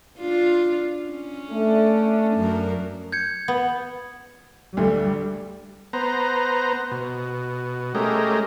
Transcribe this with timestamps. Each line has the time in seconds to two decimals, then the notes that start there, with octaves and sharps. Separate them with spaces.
0.19 D4 F4
1.11 C#4
1.50 A3 D4
2.36 F#2 A#4
3.12 G6 G#6 C#7
3.48 B3
4.77 D2 G3 A3
5.93 B3 C5 A#5
6.91 B2
7.95 G#3 A3 C#4 G4 A#4 D#5